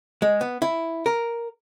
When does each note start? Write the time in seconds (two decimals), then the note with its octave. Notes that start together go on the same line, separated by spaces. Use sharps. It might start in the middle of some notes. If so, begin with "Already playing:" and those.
0.22 G#3
0.41 B3
0.62 E4
1.06 A#4